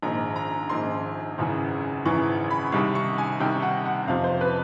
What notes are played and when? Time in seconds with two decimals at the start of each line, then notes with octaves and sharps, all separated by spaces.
0.03 A#1 G#2 D#3 A#5
0.36 A#5
0.69 A#1 G#2 D#3 C6
1.38 G#1 F#2 C#3 E3
2.05 G#1 F#2 C#3 E3 C#6
2.50 B5
2.72 C2 C3 D#3 G3 C#6
2.95 C#6
3.18 G#5
3.40 C2 C3 D#3 G3 G5
3.62 F#5
3.85 F#5
4.07 F2 C3 F3 F5
4.24 C5
4.41 B4